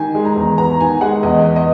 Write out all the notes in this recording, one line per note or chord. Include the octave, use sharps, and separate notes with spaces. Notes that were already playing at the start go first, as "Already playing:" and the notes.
Already playing: D#3 G#5
G#3
A#5
E2
B3 A#5
D#3 G#5
G#3 F#5
E2 D#5
B3
D#5